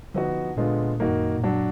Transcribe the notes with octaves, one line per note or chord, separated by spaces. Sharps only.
D3 F3 B3 D#4 F#4
A#2 D3 G#3 B3 F4
A#2
G#2 D#3 A#3 D#4 F#4
F#2
F#2
A#2
G#2 F#3 D4 F#4